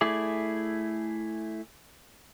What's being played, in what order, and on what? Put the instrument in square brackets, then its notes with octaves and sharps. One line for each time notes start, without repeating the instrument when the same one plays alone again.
[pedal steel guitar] A3 E4 G#4 D5